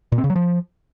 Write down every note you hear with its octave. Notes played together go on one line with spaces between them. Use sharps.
A#2
C4
C#3
F#3
F3